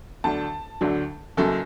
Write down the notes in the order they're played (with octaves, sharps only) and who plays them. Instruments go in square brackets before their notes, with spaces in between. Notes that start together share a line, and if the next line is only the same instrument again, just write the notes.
[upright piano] D2 D3 F#3 D4 A5
D2 D3 F#3 D4
F#1 F#2 F#3 A4